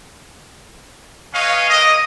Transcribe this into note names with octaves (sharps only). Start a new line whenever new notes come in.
C#4 B4 C#5 D#5 F5
A#3 D#5